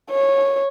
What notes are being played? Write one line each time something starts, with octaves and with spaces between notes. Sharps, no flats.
C#5